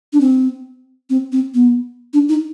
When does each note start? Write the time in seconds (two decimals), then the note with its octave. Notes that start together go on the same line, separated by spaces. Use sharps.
0.13 D4
0.20 C4
1.10 C4
1.32 C4
1.54 B3
2.13 D4
2.29 D#4